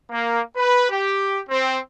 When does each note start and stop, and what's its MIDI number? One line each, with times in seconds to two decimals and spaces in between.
0.10 0.40 58
0.56 0.90 71
0.90 1.40 67
1.49 1.77 60